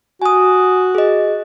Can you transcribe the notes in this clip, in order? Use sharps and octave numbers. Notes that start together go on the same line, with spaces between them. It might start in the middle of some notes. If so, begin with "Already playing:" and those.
F#4 G#5 D#6
G#4 D#5